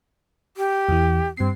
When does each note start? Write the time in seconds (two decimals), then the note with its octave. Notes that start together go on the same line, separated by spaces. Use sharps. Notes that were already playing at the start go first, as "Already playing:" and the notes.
0.57 G4
0.89 E2 E3
1.37 G2 C4 C7